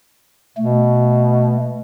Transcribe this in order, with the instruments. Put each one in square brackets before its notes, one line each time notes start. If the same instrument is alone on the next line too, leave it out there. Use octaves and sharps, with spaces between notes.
[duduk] B2 [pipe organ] A3